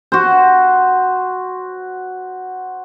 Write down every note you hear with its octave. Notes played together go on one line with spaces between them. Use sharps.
F#4 C5